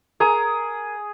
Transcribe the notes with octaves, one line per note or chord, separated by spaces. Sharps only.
G#4 A#4 D#6